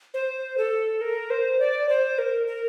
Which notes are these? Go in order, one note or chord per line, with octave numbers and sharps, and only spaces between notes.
C5
A4
A#4
C5
D5
C5
A#4
A#4